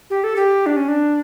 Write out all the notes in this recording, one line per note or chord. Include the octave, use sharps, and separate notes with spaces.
G4
A4
G4
D4
C#4
D4